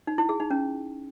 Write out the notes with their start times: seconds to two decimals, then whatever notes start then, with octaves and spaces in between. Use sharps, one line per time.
0.07 D#4
0.18 E4
0.29 G#4
0.40 D#4
0.51 C#4